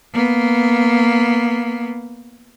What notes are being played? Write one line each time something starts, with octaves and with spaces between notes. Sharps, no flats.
A#3 B3